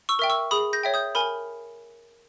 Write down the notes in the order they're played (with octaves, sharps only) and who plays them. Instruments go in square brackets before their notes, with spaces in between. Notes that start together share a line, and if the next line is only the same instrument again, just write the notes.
[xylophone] C#6 E6
A#4 E5 G5
C#6 E6
G#4 B5 D#6
G6 A#6
C#5 E5 G5
D#6 G6
A#4 G#5 B5